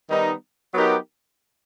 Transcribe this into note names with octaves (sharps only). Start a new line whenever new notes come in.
D#3 G3 B3 D#4
F#3 B3 D#4 G4 A#4